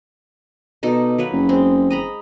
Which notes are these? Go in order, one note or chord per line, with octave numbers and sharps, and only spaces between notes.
B2 D#4 A4 D5
F#3 A#3 B4
F#1
G#3 C4
D#5 A#5 B5